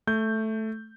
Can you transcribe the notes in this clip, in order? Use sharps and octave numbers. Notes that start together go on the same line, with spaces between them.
A3 G6